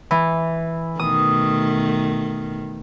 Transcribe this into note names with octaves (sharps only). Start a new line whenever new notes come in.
E3
B2 D#3 A3 D#6